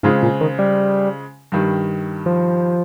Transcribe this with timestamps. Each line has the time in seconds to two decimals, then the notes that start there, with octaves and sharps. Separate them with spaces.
0.03 G#2 C#3 G#3 C4 F4 G#4
0.23 A#2
0.41 D#3
0.59 G3
1.52 G2 D#3 G3
2.26 F3